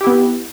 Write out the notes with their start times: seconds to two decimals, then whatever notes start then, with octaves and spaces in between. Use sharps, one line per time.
0.01 G4
0.04 E4
0.07 B3